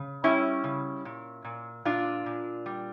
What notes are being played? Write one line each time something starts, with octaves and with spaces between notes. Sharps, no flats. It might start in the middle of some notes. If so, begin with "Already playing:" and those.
Already playing: C#3
G3 C#4 E4
C#3
A#2
A#2
A#2 D4 F4
A#2
G3